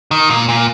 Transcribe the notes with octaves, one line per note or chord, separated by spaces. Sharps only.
D#3
A#2
A#2